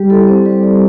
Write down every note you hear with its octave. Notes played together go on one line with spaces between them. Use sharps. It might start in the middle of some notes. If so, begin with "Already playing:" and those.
Already playing: G3 G4
E4 A4
C4 C5
G3 D5
G3 D5